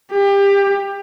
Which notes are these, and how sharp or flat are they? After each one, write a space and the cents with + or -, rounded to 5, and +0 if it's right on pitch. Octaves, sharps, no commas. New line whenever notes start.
G4 +25